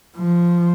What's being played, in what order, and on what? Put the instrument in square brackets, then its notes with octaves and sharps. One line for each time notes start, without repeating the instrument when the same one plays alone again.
[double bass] F3